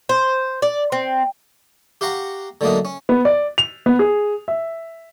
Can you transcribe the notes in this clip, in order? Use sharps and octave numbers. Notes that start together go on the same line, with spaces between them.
C5
D5
C4
G4 F5 F#5 A#5 C#6
D3 F#3 A3 A#3 D#4
C#4
B3
D5
F7
B3
G#4
E5